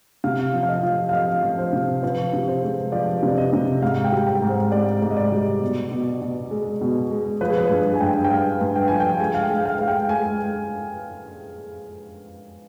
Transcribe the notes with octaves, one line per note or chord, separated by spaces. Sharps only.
C3 F5
F3
F5
D#5
F3
F5
F3 D#5
F3
C5
C3
F3 B4
C3
C5
G#3
F3 D5
C3
D5
D#5
C3
G#2 F5
F5
G5
G3
G5
G#2
C5
G#2 D5
G#2
D#5
D5
G3
B2
B2
B2
G#3
B2
G#3
F3 B4
G#4
B4
G2 G#4
G#5
G2 G5
G5
G2 F5
G2
G5
F3 G#5
G5
G#3 G#5
F5
G5
G#3
G5
F5
G#3 F5
G5
G#3 G#5